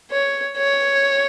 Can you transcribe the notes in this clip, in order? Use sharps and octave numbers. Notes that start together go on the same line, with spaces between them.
C#5
C#5